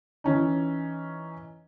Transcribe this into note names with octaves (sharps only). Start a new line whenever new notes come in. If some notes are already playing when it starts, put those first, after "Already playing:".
E3 C#4 D#4